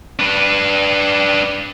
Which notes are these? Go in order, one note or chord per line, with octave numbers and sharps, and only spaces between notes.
D4 B4